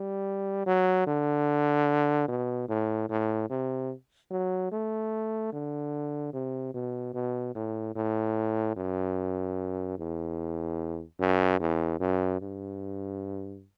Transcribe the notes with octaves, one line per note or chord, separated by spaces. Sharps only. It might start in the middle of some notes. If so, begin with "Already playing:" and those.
Already playing: G3
F#3
D3
B2
A2
A2
C3
F#3
A3
D3
C3
B2
B2
A2
A2
F#2
E2
F#2
E2
F#2
G2